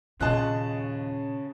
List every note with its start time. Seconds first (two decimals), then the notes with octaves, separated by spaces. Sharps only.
0.21 D#2 A#2 C#3 F4 G#4 D#5 A5 F#6